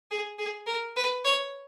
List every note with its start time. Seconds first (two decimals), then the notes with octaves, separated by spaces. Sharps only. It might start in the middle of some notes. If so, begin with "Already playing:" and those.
0.11 G#4
0.39 G#4
0.67 A#4
0.96 B4
1.25 C#5